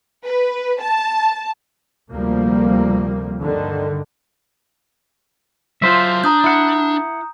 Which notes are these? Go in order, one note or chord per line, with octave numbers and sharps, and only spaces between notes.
B4
A5
D2 C3 F3 G3 A#3
G2 D3 D#3
F#3 F4 C5 E5 F5
D4 A#5 D#6 G6
E4 F#5